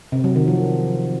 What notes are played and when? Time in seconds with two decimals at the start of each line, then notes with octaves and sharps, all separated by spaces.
0.12 C3
0.24 F#3
0.36 D#3
0.47 F3